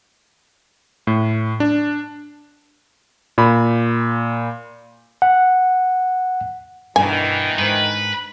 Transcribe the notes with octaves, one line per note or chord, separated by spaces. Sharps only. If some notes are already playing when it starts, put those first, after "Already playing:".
A2
D4
A#2 B5
F#5
G2 B2 D#3 E3 D#4 G#5
G#2 B4